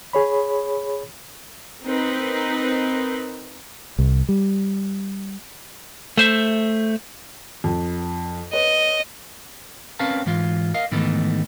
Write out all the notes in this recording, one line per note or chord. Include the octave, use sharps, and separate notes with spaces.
G#4 C#5 B5
C4 D#4 A#4 B4
C2
G3
A3 C5 E5
F2
B4 C#5 D#5
C4 C#4 A#4 B4 F5 A5
G#2 E3 F4
A#4 D#5 F5
G#2 D#3 E3 A3 B3 D#4